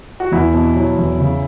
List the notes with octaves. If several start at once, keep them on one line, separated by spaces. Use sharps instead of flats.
F#4
E2 E4
B2
F#3
E2
C#3